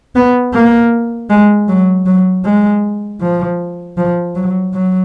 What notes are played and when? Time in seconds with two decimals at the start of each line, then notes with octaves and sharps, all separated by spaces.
0.16 B3
0.54 A#3
1.30 G#3
1.68 F#3
2.06 F#3
2.45 G#3
3.21 F3
3.97 F3
4.35 F#3
4.74 F#3